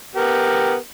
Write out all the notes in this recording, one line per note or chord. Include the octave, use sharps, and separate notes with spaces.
B3 G4 A#4